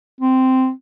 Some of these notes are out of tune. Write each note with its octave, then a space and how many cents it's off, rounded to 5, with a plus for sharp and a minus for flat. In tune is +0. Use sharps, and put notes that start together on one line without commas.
C4 -10